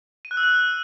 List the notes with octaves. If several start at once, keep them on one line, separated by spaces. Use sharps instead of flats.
D#7
F#6
E6
F#6